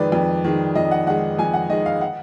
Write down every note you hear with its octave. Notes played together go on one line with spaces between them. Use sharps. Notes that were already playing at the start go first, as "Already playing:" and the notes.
Already playing: F2 D#3 G#3 B4 D5
F2
D#3 G#3
F2 D#5
F#5
D#3 G#3 F#5
F2 G#5
F#5
D#3 G#3 D#5
F5
F#5